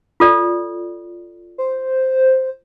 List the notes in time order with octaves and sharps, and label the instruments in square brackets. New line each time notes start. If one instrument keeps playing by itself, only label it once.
[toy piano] F4 A4 D5
[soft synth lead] C5